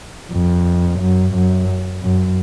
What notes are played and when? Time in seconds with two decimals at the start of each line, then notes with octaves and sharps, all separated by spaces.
0.32 F2
1.00 F#2
1.34 F#2
2.02 F#2